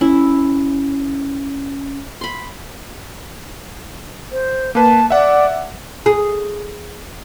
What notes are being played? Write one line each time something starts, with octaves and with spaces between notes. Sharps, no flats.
C#4 E4
B5 C6
C5
A#3 B4 A5
D5 E5 F#5
G#4